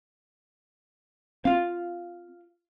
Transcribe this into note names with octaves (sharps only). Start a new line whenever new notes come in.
C4 F4 F5